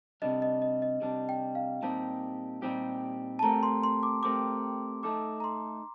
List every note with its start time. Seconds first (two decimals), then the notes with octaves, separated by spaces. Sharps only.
0.22 C3 G3 D4 D#5
0.42 D#5
0.62 D#5
0.82 D#5
1.01 C3 G3 D4
1.29 G5
1.55 F5
1.82 A#2 G3 C4 D#4 G4 A5
2.62 A#2 G3 C4 D#4 G4
3.39 A5
3.43 A3 C4 G4 A#4 A#5
3.63 C6
3.83 C6
4.03 D6
4.23 A3 C4 G4 A#4 D6
5.03 A3 D#4 A4 D6
5.40 A#5
5.44 C6